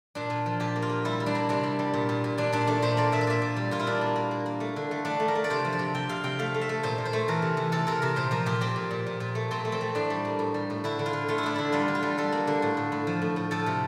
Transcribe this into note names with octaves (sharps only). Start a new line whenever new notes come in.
A#2 D4
A#2
F3
A#2 G4
A#3
F4
A#3
G3 E4
G3
D4
A#3
C3 D4
G3
G3
A#2
A#2
A#2
A#2 D4
A#2 D4
A3 D4
A#2 C5
A#3 D5
A#2 E5
D5
A#2 E5
A#2
G3
A#2 F4
E4
A#3 D4
A#3
A#3
A#3
A#3
A3
D3
A3
A3 D4
A3
A#4
A3
D5
C3 C5
F3
D5
C3
C3 G5
C3 F5
C3 G5
A3 F5
A3
E5
A3
A#2 C5
A#2
C5
A3
E3 A#4
C3
E3
C3 A4
C3 A#4
C3 A#4
A#2 C5
F3 A#4
A#2 G4
A#2 C4
A#2
A#2
A#2
A#2
A3
A#2 C4
A3
C4
A3
A2 D4
G3
A#3
A2
G3
A2
D3 E4
D3
F4
D3
A3 F4
E4
A3 D4
D3 E4
G3 F4
D3
F4
G3
G3 A4
A#3
D3
A2
A2
A2
F3
A2
A2
F3 A4
C3